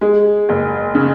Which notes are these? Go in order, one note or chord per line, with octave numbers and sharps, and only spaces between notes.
G#3
F#1
C#3